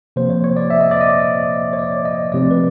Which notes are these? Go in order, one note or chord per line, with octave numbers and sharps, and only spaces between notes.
C3 F3 A#3 C5
C#5
C#5
D5
E5
D#5
D5
D#5
C#5
D5
D#5
C3 F3 A3 C4 D5
B4